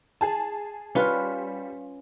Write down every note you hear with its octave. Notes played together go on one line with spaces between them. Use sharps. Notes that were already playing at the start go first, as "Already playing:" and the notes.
G#4 A5
G3 C#4 F4 B4